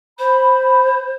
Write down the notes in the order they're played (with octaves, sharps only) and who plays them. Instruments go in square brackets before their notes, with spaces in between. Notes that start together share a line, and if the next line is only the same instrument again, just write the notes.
[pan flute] C5 [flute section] B5